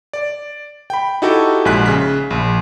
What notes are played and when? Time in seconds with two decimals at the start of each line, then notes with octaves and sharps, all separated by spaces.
0.13 D5
0.90 G5 B5
1.22 D#4 E4 F#4 G4 A4
1.65 A#1 G#2 G#5 F#6 B6
1.86 C#3 B6
2.30 A#1